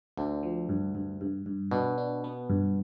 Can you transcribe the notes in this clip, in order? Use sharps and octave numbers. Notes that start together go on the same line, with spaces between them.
D2 D3 D4
F3
G2
G2
G2
G2
B2 D4
D4
B3
G2